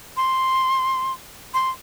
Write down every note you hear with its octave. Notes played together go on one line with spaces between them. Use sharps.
C6
C6